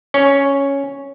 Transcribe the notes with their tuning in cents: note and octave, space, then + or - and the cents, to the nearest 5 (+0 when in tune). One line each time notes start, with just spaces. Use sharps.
C#4 +0 C#5 +0